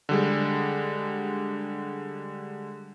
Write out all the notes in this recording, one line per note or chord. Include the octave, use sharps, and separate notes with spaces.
D3 G3 G#3